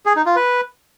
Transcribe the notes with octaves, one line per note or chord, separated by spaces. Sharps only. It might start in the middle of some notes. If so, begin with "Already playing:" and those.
G#4
D#4
F4
B4